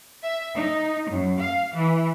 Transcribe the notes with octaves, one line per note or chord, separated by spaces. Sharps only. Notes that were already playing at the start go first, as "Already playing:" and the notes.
E5
D#4
F#2
F5
E3